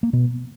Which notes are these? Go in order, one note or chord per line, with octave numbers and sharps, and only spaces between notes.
A#3
B2 B3